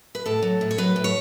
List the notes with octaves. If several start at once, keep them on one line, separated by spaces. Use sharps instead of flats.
B4
A2 A4
F#3
A2
C#5
F#3 B4
A2
C#5